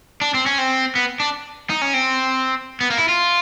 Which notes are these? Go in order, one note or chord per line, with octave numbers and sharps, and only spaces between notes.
D4
C4
C#4
C4
B3
D4
D#4
C#4
C4
B3
A#3
E4
F4